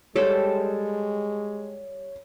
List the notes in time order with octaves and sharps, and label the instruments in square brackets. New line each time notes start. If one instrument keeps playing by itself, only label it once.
[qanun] G3 A4 C5 [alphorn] G#3 [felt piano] C#5